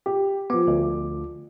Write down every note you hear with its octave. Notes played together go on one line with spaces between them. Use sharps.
G4
F3 B3 D6
D2